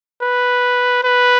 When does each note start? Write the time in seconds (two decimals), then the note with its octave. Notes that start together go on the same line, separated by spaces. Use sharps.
0.22 B4
1.04 B4